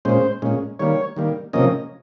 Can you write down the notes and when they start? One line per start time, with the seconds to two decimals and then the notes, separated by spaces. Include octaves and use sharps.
0.05 A#2 G#3 C#4 C5
0.42 A#2 G#3 C#4
0.79 D#3 G3 A#3 C#5
1.16 D#3 G3 A#3
1.53 C3 F3 A#3 C#4 D#5